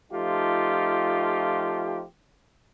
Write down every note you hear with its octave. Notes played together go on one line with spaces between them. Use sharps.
F3 A3 D#4 F4 G4